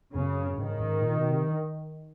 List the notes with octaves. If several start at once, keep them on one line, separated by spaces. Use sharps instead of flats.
F#2 C#3
G#2 D#3
G#2
A#2
B2
C3